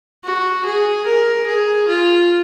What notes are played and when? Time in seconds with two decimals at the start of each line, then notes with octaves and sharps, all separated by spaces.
0.25 F#4
0.65 G#4
1.06 A#4
1.47 G#4
1.88 F4